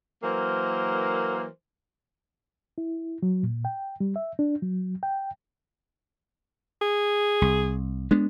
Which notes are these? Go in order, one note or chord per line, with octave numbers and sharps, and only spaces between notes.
E3 F#3 A#3 A#4 C5
E4
F#3
A#2
G5
G3
E5
D4
F#3
G5
G#4
C2
G#3 B3 D4